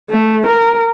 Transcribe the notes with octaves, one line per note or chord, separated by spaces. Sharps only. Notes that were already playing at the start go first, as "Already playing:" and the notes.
A3
A#4